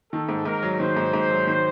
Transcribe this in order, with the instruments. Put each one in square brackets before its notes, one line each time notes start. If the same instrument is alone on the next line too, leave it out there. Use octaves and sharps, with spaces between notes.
[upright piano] D#3 [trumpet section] A4
[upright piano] G#2
[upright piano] G#2 [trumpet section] A#4
[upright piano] F#3
[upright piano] D#3 [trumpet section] C5
[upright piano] G#2
G#2
F#3
D#3